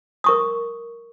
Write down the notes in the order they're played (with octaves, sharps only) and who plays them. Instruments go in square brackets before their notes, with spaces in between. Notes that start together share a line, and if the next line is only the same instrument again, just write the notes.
[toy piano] A#4 C#6 D#6